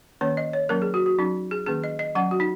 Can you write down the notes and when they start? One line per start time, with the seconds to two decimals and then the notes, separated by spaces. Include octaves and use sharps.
0.21 D#3 A#3 C#4 C#5
0.37 D#5
0.53 C#5
0.69 F#3 A#3 C#4 A#4
0.82 G#4
0.94 F#4
1.06 F#4
1.18 F#3 C#4 D#4
1.51 G#4
1.66 D#3 A#3 C#4 G#4
1.84 D#5
1.99 D#5
2.15 F#3 C#4 F#5
2.31 F#4
2.40 D#4